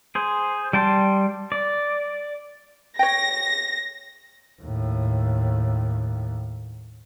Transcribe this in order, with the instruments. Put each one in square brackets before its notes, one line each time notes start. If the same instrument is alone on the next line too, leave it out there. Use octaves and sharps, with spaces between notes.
[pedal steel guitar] G#4 C5
G3 G5 A5 C6
D5
[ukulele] C#5 G5 [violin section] A#6
[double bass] D#2 A2